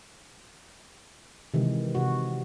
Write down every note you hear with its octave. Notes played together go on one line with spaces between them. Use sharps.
C3 D#3 E3 G#3
C3 F#4